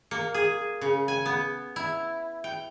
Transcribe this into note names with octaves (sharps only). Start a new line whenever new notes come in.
A#3
G#4
C#3
G#5
B3
E4
G5